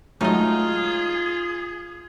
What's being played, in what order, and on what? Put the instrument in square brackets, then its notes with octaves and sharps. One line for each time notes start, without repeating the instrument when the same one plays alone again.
[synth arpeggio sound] F#3 G#3 A3 [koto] D#4 D#5 [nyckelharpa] F4 [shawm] G#4